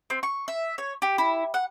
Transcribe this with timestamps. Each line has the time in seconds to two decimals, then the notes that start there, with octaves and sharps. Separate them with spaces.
0.10 C4
0.23 C#6
0.48 E5
0.78 C#5
1.02 G4
1.18 E4
1.54 F#5